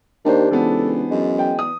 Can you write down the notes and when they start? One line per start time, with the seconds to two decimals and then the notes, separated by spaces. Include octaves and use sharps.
0.25 D#2 D#3 D4 G4 C5
0.51 C#2 E3 B3 A4
1.11 F#2 G#3
1.39 G5
1.59 D#6